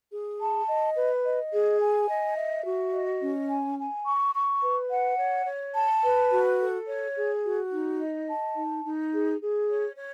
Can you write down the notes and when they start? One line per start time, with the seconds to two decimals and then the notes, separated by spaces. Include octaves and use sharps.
0.11 G#4
0.39 A5
0.67 D#5
0.96 B4
1.25 D#5
1.52 G#4
1.81 G#5
2.09 D#5
2.37 E5
2.65 F#4
2.93 D#5
3.21 C#4
3.49 G#5
3.78 G#5
4.06 C#6
4.34 C#6
4.62 B4
4.91 F#5
5.19 C#5
5.46 C#5
5.74 A5
6.02 B4
6.32 F#4
6.60 A4
6.87 C#5
7.15 G#4
7.44 F#4
7.72 D#4
8.00 D#5
8.28 A5
8.56 D#4
8.84 D#4
9.13 G#4
9.41 G#4
9.69 C#5
9.97 C#5